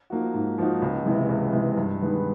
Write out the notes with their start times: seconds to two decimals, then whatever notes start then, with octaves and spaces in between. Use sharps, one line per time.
0.10 F3 A#3 D#4 F#4
0.34 G#2
0.58 F3 A#3 D#4 F#4
0.82 C#2
1.05 C3 E3 G#3
1.29 C#2
1.53 C3 E3 G#3
1.77 G2
2.01 D#3 G#3 B3